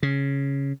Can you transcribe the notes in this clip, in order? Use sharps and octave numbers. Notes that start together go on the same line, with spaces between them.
C#3